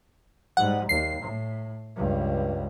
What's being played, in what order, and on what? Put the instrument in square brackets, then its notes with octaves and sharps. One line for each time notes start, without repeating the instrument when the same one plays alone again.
[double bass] G#2 G3 [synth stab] F#5
[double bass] D#2 [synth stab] C7
[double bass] A2
C#2 G2